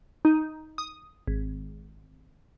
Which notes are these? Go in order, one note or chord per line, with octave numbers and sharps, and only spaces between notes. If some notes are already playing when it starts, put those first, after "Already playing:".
D#4
D#6
G#1